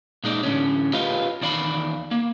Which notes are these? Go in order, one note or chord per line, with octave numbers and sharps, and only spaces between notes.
A#2 G#3 D#4 D5
A2 D3 C#4
F4 G4 B4 D#5 F5
E2 D#3 D5 F5 B5
A#3